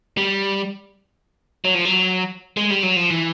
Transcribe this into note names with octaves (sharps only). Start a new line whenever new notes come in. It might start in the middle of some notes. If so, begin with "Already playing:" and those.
G3
F#3
F3
F#3
G#3
G3
F#3
F3
E3